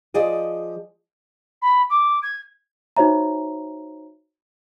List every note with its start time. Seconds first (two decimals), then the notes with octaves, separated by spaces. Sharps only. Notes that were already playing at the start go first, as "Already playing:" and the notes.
0.14 F3 G#4 D5 D#5
1.62 B5
1.90 D6
2.22 G#6
2.97 D#4 F#4 C5 C#5 E5 A#5